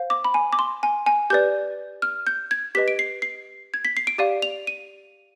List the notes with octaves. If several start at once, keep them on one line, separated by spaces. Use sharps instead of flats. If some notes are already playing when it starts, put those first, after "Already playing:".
Already playing: C5 F5
D6
B5
G#5
D6
C6
G#5
G#5
G4 B4 D5 G6
F6
G6
G#6
G4 B4 D#5 B6
D7
C7
C7
G#6
B6
C7
D7
G4 D5 F5 D#7
F7
D#7